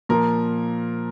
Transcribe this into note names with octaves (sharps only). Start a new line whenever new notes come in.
A#2 F3 A#4